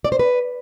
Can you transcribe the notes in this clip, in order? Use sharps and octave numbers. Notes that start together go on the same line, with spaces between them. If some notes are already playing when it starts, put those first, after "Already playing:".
D5
C5
B4